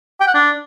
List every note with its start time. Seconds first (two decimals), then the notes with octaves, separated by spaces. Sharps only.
0.20 G5
0.27 F#5
0.34 D4